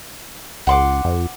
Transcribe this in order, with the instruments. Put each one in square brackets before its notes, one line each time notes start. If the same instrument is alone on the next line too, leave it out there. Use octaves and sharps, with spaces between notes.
[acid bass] C#2 [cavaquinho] F#5 C6 D6
[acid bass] F2